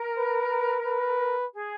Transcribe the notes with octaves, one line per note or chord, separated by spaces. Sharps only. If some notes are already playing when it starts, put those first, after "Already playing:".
Already playing: A#4
B4
B4
G#4